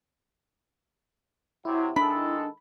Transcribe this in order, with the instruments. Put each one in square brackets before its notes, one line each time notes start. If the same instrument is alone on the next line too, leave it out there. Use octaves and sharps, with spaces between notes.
[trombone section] C3 F#3 [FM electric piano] E4
[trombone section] D#3 G#3 A4 [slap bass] D4 [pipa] B5